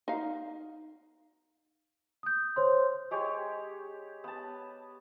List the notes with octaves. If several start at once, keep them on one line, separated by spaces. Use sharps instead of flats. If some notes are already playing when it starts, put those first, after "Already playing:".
D#4 F5
D#6 G6
C5 C#5 C6
G#3 G4 C#5
B3 A5